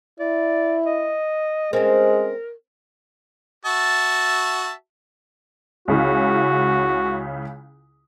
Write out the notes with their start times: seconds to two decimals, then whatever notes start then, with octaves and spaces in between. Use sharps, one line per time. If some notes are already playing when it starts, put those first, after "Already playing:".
0.20 E4 D5
0.86 D#5
1.73 G#3 C4 C#4 A#4
3.66 F#4 E5 A5
5.88 C#2 C#3 E4 F#4